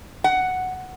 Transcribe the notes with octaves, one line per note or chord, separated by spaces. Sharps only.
F#5